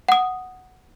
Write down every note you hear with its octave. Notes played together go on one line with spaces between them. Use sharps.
F#5 D#6